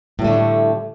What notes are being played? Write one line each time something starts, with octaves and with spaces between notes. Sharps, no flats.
A2 D3 G3 A3